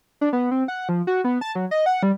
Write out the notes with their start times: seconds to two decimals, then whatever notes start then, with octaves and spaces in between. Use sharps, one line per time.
0.21 D4
0.33 B3
0.51 C4
0.68 F#5
0.89 F3
1.07 F#4
1.24 B3
1.41 A5
1.55 F#3
1.71 D#5
1.86 F#5
2.03 G3